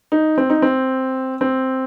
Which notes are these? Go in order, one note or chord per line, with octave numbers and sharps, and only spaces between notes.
D#4
C4
D#4
C4
C4